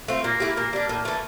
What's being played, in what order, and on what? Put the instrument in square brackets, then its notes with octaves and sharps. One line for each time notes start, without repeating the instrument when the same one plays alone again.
[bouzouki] A3 C4 F4
[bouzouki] A#2 [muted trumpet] A#3
[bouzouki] A3 E4 G4
[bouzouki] A#2 [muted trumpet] A#3
[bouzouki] G3 D4
[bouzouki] A2 [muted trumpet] A#3
[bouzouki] E3 A3